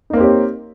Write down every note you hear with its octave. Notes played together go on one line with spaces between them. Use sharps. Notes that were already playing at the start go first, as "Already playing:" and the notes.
A#3 C4 D#4 G4 C#5